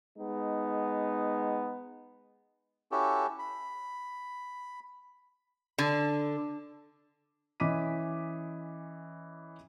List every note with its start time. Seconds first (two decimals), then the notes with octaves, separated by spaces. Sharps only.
0.16 G#3 B3 D#4
2.92 C#4 E4 F#4 G4 A4
3.39 B5
5.78 D3
7.60 E3 C#4 D#5 D6 B6 D#7